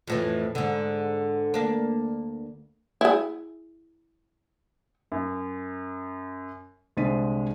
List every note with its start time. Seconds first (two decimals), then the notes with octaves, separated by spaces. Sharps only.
0.07 F2 A2 E3
0.55 G#2 D3
1.54 D2 A#3 D4
3.01 E4 G#4
5.12 F#2
6.97 C2 D3 G#3 C5 B6 D#7